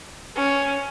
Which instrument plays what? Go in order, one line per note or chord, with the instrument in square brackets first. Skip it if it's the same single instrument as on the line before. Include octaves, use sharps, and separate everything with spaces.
[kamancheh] C#4